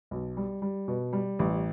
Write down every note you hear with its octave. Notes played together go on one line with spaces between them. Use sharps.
B1
G3
G3
B2
G3
A1